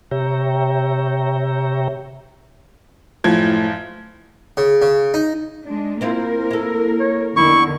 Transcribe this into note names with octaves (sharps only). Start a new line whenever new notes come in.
C3 G4 C#5 E5 G5 A#5
F#1 A2 F3 G#6
C#3
C#3
D#4
G#3 D4
A#3 C4 E4 F4 A#4
E4 A4
C#5
E2 D3 D#3 E4 C#6